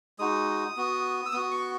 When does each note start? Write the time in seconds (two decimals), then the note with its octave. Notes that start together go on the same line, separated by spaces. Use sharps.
0.19 G#3 D#4 F#4 D#6
0.77 B3 F#4
1.26 E6
1.32 B3 F#4 D#6
1.51 C#6